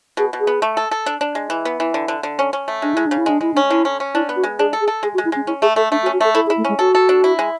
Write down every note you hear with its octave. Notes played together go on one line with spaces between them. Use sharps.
B2 G#4
B2
G#4
B3
A3
A4
A4
D4
D4
G#3
E3
B3
E3
D3
D3
D3
C#4
C#4
A3
G#3 D4
G#3 E4
C#3 D4
E4
G#3 D4
G#3 E4
D4
C#4
D3 E4
C#4
C#4
D4 E4
B3
F#4
G#3
D4 G#4
A4
G#4
A4
G#3 G#4
F#4
G#3
E4
G#3 C#4
C#4 E4
A3 G#4
A3 A4
A3 D4
F#4
C#4
F#4
A3 A4
E4 A4
G#4
E4
A3
G#3 C#4
F#4 A4
A4
D4
E4
G#3